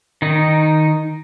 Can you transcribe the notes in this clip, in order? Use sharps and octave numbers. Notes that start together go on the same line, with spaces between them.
D#3 D#4